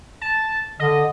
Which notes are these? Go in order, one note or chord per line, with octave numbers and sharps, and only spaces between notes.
A5
D3 D#5